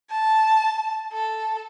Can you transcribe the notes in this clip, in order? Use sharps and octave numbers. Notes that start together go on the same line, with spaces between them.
A5
A4